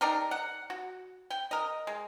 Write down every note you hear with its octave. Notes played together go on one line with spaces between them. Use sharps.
D4 D#4 G4 A#4
F#5
F#4
G5
A#4 D#5
G#3